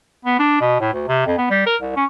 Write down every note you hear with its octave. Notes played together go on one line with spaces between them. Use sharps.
B3
D4
B2
A2
D2
C3
F2
B3
G3
A#4
C2
C#4